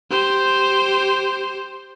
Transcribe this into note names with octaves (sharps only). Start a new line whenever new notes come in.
G4 C5